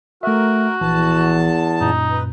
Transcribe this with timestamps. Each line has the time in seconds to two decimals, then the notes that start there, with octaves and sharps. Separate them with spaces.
0.23 A3 F#4 A#4 E5
0.81 A#1 E2 E3 A5
1.81 F#2 A#2 D#4
2.11 B4